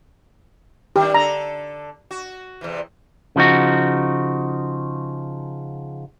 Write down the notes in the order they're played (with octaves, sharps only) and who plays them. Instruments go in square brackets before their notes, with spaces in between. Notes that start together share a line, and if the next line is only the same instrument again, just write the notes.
[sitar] D#3 D4 [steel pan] G4
[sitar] D3 A4 [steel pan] A#5
[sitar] F#4
E2 C3 E3
[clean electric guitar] C#3 F3 D#4 F#4